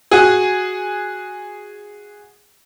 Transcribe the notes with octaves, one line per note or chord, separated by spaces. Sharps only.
F#4 G#4